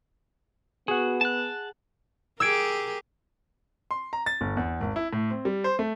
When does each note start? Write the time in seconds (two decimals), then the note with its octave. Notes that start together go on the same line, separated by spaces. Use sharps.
0.88 B3 F#4 G#4 F#5
1.21 A5 F#6
2.40 G4 G#4 A#4 E6 G#6 D7
3.91 C6
4.13 A#5
4.26 A6
4.41 G1
4.57 E2
4.81 G#1
4.96 E4
5.13 A2
5.31 C4
5.45 G3
5.64 C5
5.79 A3